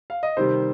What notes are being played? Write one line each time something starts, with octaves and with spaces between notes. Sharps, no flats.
F5
D#5
C3 D#3 G3 C5